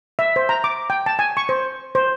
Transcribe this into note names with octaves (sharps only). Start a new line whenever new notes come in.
E5
C5
A#5
D6
G5
A5
G#5
C#6
C5
C5